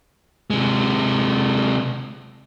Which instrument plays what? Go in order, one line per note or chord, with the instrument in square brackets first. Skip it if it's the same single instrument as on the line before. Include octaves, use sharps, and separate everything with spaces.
[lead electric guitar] C3 G#3